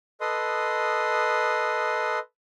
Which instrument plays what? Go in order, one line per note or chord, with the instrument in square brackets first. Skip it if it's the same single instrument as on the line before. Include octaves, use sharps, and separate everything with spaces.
[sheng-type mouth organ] A4 B4 D#5 C6 D#6